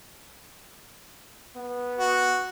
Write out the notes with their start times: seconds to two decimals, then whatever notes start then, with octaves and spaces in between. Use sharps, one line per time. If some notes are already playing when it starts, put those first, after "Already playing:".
1.56 B3
1.97 F#4